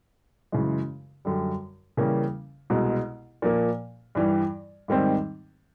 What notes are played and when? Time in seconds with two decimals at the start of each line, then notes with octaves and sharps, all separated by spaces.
0.52 F#2 C#3 E3 G#3
1.25 F#2 D3 G3
1.97 C#3 E3 G3 A#3 C#4
2.70 C2 B2 G#3
3.42 A#2 F3 A#3
4.15 G2 E3 G3
4.88 G#2 D#3 G3 C4